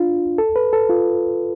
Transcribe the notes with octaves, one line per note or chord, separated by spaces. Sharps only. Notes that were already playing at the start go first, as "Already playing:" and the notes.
Already playing: D4 F4
A4
B4
A4
F4